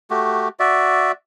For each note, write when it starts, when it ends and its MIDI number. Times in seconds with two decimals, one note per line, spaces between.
0.10 0.48 57
0.10 0.48 66
0.10 0.48 67
0.60 1.12 66
0.60 1.12 74
0.60 1.12 76